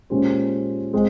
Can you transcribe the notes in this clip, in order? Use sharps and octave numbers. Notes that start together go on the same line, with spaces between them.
A#2 G#3 C#4 G4 C5
G#3 C4